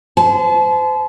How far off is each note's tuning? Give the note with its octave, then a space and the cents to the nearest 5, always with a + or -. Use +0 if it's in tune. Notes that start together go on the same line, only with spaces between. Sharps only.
C5 -35 A5 -35